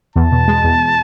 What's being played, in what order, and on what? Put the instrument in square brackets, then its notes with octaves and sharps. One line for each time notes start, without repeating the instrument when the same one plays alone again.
[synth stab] E2 [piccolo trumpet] A5
[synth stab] B2
G#3
E2